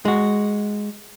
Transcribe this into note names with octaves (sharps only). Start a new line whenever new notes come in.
G#3 F#4